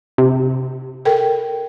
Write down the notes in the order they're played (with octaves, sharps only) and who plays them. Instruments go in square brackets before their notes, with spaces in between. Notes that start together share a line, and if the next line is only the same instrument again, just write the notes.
[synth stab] C3
[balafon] A4 A#4 G5